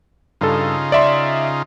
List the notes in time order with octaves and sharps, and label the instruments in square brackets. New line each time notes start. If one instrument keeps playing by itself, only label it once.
[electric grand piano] G2 A4 [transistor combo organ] C#3 D#4 F4
[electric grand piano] D5 E5 C6